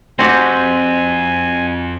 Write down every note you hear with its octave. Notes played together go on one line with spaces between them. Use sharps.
F2 C4 F#4 G4 G#5